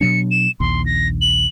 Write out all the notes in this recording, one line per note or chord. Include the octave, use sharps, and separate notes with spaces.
B2 F#3 D4 C#7
E7
A#1 D#2 C6
A#6
F#7